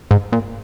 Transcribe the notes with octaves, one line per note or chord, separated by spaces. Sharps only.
G#2
A#2